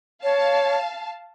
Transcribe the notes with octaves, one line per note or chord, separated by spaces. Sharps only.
C#5 F5 A5